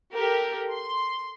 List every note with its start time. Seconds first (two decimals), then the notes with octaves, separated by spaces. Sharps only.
0.12 G4 A4 A#4
0.71 C6